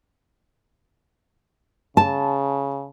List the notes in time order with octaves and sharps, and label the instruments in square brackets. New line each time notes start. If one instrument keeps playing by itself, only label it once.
[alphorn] C#3 [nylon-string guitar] A5